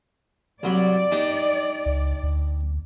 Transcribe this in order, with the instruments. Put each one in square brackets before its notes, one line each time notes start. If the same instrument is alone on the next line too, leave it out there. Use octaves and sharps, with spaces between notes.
[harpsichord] C2 F#3 B5 [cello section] D5
[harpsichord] D4 D#4 G4
[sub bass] C#2
D2